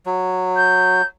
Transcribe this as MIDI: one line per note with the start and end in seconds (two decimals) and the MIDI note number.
0.06 1.02 54
0.56 1.05 91